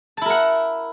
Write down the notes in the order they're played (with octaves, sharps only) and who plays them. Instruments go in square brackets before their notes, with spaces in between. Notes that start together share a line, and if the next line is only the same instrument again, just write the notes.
[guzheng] A5
E4
A#4
F#5